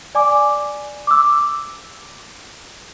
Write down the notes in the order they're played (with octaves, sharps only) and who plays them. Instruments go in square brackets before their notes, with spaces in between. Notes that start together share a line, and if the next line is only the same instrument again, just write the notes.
[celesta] D5 G#5 D6
D6 E6